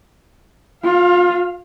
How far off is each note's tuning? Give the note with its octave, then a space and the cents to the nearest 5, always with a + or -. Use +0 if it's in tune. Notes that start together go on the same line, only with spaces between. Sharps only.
F4 +30 F5 +0